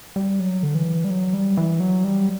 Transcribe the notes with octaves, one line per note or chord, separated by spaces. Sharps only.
G3
F#3
D3
E3
G3
F#3
G3
E3
F#3
G3